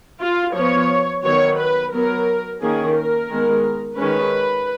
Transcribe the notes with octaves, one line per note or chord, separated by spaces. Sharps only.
F4
F3 B3 C#5
D#3 F#3 B3 C#5
B4
F#3 B3 A#4
D#3 A#3 C#4 G#4
A#4
D#3 G#3 B3
D#3 G#3 C#4 B4